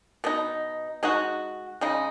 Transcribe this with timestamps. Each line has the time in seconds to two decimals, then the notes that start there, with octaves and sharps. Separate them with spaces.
0.24 B2 B3 D#4
1.03 G#3 D#4 F#4
1.81 C#3 G#3 D#4